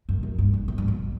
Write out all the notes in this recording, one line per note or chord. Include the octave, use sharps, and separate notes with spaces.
F#2
F#2
G2
G2
A2
G2
F#2